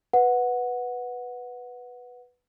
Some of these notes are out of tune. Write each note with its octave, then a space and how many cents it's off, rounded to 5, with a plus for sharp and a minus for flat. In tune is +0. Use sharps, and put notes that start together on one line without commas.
B4 +0 F#5 -10